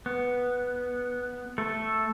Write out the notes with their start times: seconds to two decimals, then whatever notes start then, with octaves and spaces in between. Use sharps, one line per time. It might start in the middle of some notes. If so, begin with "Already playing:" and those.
0.06 B3
1.58 A3 A4